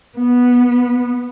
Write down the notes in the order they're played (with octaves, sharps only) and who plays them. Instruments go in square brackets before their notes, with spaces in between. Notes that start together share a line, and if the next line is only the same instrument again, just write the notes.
[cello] B3